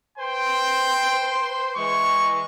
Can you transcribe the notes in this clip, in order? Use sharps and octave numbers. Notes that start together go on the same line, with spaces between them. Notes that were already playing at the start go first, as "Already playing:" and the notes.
B4 C5 G5 C6
E3 G#3 C#6